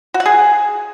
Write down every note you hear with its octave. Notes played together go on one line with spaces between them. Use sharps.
F#4
F#5
G#4